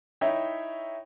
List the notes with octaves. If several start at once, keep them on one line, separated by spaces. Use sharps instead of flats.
D#4 E4 C#5 E5 G5